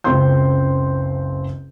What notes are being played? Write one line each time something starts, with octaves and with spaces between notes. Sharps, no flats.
F#1 C#2 C4 F4 C6 G6